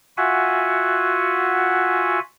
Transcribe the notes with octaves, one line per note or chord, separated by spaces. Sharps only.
F4 F#4 E5 F#5 G#5